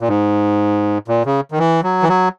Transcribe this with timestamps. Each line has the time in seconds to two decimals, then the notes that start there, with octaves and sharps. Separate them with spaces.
0.01 A#2
0.08 G#2
1.08 A#2
1.26 C#3
1.52 D#3
1.58 E3
1.83 F#3
2.03 E3
2.09 F#3